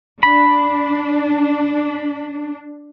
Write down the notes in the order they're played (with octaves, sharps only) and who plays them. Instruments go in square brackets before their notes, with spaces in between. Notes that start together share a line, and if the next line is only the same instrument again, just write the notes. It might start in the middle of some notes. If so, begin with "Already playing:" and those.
[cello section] D4 [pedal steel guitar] B5